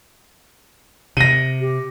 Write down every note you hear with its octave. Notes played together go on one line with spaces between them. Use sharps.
C3 A#6 D#7
G4